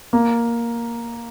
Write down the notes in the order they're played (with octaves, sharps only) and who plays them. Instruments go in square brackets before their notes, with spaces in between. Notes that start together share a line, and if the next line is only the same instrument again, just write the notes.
[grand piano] A#3